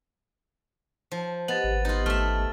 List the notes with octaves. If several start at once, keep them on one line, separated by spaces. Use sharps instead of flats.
F3
B3 G4 D#5 A6 F#7
G#1 F#5
B3 D#4 F4 G4 D#5
G#1 A3 E5 F6